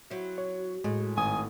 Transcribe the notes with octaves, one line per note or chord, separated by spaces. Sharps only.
F#3 C4 E4 F#4
C#5
A2 G#3
G#1 G#5 D#6